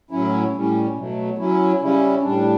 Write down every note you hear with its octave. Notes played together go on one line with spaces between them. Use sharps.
A2 F#3 C#4 E4
A2 G3 C#4
B2 F#3 A3
F#3 C#4 E4
C#3 G3 C#4 E4
A2 G3 D4